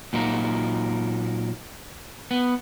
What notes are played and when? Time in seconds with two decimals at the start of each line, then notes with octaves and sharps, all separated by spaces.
0.13 A#2 F#3 A#3 D#4
2.31 B3